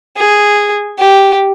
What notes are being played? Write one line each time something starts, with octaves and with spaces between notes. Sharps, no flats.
G#4
G4